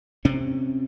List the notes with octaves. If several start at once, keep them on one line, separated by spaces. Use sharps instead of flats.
C3 C4 C#4